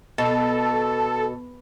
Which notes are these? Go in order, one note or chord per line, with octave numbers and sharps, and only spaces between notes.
B2 A4